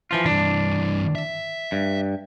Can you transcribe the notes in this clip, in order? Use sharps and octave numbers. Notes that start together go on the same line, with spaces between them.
E3 F3 F4
G2 E3 D4
E5
G2